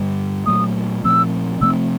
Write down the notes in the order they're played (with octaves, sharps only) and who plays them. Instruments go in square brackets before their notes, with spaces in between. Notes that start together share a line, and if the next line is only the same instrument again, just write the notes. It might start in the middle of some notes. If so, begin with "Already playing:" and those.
Already playing: [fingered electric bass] G2 D3 G3
[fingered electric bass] A#2 F#3 A3 [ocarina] D#6
[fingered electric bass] A#2 F3 A3 C4 [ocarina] E6
[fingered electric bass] C3 F3 A3 C4 [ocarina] E6